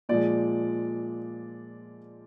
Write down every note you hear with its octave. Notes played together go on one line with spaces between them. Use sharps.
A#2 F3 G#3 D5